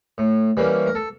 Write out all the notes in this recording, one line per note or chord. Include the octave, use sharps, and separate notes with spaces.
A2
E3 G3 A#3 C#4
A#4
A4